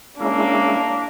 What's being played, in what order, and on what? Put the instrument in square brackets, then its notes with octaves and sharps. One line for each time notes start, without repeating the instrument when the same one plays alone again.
[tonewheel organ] G#3 C#4 E4 [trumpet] A#3 [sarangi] D4